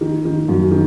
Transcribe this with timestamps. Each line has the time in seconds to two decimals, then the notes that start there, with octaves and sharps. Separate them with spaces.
0.01 D#3
0.25 D#3
0.48 F#2
0.71 D#3